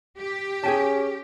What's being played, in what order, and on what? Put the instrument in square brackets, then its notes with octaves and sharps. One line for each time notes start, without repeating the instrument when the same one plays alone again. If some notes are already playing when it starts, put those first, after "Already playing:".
[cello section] G4
[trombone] C#4 [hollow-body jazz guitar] G#4 G5 A5